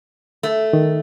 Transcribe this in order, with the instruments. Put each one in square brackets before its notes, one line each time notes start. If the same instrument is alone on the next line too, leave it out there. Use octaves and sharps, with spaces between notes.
[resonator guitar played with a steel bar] A3
[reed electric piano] D#3